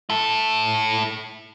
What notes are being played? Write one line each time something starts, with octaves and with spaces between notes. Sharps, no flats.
E4 A4